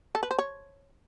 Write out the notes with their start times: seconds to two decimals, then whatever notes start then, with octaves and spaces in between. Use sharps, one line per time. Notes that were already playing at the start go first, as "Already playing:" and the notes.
0.15 A4
0.23 B4
0.31 C5
0.39 C#5